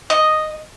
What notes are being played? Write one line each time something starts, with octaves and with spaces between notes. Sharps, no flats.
D#5